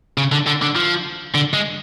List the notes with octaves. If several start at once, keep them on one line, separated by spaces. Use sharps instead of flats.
C#3
D3
D3
D3
F3
D3
G#3